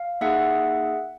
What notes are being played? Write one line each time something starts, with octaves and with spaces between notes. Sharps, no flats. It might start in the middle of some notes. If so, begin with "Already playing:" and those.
Already playing: F5
A#3 D#4 G#4 E5 F#5